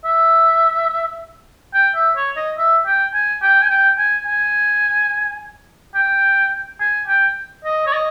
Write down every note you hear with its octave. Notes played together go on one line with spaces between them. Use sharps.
E5
G5
E5
C#5
D#5
E5
G5
G#5
G5
G#5
G5
G#5
G#5
G5
G#5
G5
D#5
C#5
D#5